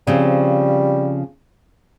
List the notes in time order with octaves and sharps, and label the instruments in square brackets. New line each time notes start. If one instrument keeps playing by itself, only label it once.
[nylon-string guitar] C#3 F3 C4 [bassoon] G3